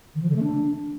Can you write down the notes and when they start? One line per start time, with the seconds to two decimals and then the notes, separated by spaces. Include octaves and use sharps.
0.15 D#3
0.22 F3
0.29 D3
0.36 A3
0.43 D4